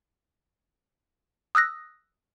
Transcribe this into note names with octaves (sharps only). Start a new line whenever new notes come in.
D#6 E6 F#6 A#6